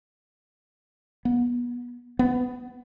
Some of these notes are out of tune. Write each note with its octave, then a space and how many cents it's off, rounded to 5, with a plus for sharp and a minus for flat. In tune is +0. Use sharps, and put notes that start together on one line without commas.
B3 -25
B3 +10